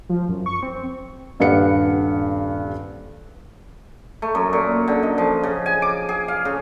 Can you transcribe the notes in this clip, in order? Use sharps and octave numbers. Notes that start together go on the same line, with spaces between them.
F3
F#2
C#6
C4
D#1 G2 B4 F5 F#5 C#7
A3
F#2
A#2
D3
D#5
F3
C#3
G#5
D6
G#4
F5
C#3